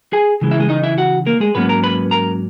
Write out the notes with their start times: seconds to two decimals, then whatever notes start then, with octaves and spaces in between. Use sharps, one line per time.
0.13 G#4 G#5
0.41 C#3 E3 G#3
0.51 E4 E5
0.60 G#3 G#4
0.69 D#4 D#5
0.83 E4 E5
0.98 F#4 F#5
1.26 A#3 A#4
1.40 G#3 G#4
1.55 G#2 F#3 A#3 B3 C#4 B4
1.69 A#4 A#5
1.83 B4 B5
2.11 A#4 A#5